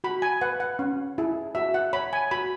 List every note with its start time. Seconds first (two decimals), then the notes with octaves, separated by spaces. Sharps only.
0.04 F#4 B5
0.22 G#5
0.41 B4 F#5
0.60 F#5
0.79 C#4
1.18 E4 G#4
1.55 F#4 E5
1.74 F#5
1.93 C#5 B5
2.13 G#5
2.31 F#4 B5